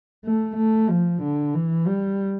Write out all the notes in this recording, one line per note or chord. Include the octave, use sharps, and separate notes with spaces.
A3
A3
F3
D3
E3
G3